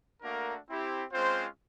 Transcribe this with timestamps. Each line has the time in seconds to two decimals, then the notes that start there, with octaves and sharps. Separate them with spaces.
0.22 A3 A#3 D4 F#4 A#4
0.68 C4 E4 G4
1.13 G#3 C4 C#4 F4 C5